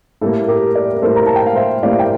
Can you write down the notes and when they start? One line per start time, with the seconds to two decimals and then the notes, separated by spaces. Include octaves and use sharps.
0.21 A2 G3 A#3 A4
0.48 G4 A#4
0.75 A#4 D5
0.97 A#4
1.02 A2 G3 A#3 A4 C5
1.16 A#5
1.26 A5
1.36 G5
1.46 F5
1.56 C5 E5
1.83 A2 G3 A#3 D5 F5
1.99 G5